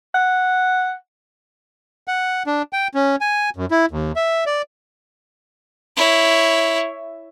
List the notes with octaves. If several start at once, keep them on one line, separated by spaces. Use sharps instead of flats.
F#5
F#5
D4
G5
C#4
G#5
F#2
E4
D#2
E5
D5
E4 C#5